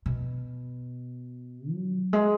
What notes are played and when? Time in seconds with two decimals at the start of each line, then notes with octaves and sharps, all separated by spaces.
0.06 B2
1.72 F#3
2.13 G#3